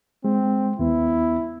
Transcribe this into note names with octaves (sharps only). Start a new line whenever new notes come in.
G#3 C4
D#2 B3 E4